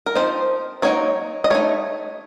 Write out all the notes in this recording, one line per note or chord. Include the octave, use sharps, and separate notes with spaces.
A#4
F3 C4 D#4 C5
F#3 A#3 D#4 C#5
D#5
A3 D#4 C#5